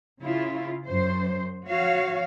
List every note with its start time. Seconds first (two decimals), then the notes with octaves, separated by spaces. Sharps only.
0.22 C#3 E4 F4
0.87 F#2 C5
1.67 F3 F#4 C#5 F5